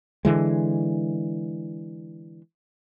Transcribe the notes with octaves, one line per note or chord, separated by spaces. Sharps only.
D3 E3 G#3